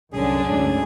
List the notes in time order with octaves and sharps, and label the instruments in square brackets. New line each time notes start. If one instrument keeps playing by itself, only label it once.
[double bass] C2 [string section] F#2 D3 D4 [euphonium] C#4 [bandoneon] G#4
[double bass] D2 G#2 [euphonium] C#4